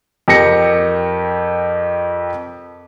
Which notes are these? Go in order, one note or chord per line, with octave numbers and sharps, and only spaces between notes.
F2 G4 A#4 A#6 C#7